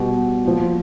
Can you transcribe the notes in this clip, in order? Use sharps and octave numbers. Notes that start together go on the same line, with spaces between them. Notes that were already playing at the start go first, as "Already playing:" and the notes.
Already playing: B2 G3
A#2 F3